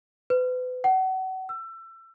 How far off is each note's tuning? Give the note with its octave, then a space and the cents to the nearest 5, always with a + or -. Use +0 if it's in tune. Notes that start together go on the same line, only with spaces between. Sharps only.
B4 +35
F#5 +30
E6 +25